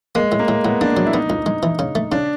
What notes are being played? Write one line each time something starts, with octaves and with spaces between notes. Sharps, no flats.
G#3 A#3
A2
A#3
A2
A2 B3
A#3 D4
F#3
E4
B3 D#4
C#2
G#3
E3
C#3
A3
C#3 D4